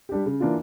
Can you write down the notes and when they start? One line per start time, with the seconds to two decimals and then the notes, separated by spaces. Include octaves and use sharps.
0.09 G3 D4 G4
0.26 C#3
0.40 E3 A#3 D4 F4